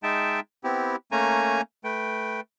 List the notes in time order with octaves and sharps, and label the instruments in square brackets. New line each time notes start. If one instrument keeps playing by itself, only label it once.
[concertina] G#3 D#4 E5 G5 A5
B3 C4 E4 G4
A3 A#3 C#4 G#5 A#5
A3 B4 G5